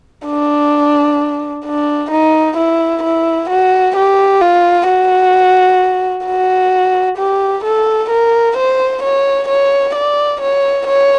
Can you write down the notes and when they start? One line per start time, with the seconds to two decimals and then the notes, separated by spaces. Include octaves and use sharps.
0.26 D4
1.65 D4
2.11 D#4
2.57 E4
3.03 E4
3.50 F#4
3.96 G4
4.41 F4
4.87 F#4
6.26 F#4
7.18 G4
7.64 A4
8.10 A#4
8.57 C5
9.03 C#5
9.49 C#5
9.95 D5
10.41 C#5
10.87 C#5